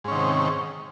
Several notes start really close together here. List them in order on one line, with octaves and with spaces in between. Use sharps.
G#2 C#4 D#3 C3